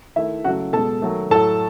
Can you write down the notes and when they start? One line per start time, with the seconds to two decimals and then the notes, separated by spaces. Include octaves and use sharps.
0.16 D#3 A3 E4 E5
0.44 C#3 F#3 A3 F#4 F#5
0.73 B2 G#3 A4 A5
1.02 D#3 F#3 A3
1.30 A2 F#3 A3 A4 A5